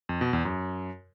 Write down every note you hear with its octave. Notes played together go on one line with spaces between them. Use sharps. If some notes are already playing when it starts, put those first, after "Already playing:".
F2
B2
E2
F#2